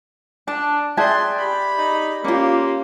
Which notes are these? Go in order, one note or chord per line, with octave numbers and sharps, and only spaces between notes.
D4 A5
G#4 D5 E5 G5 A5 C6 F#6 G#6
G4 B5
D#4
A#3 C#4 F4 G4